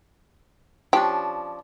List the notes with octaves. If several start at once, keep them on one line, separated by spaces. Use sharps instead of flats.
F3 C#4 D4 G4